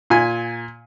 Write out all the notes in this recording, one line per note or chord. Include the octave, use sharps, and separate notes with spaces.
A#2 G#5